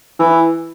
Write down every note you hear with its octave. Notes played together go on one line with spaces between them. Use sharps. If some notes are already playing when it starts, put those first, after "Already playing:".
E3